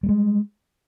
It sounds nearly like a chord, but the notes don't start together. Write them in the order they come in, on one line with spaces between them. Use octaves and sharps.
G3 A#3 G#3